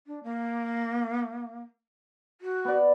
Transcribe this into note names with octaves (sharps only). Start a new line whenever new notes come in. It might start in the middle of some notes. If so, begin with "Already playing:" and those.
D4
A#3
F#4
B3 D5